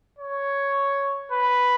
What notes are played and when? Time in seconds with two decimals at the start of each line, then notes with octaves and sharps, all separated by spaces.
0.18 C#5
1.32 B4